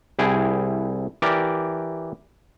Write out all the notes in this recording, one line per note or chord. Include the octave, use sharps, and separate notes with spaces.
C2 E4 G#4 G5
E3 G4 A#4 D5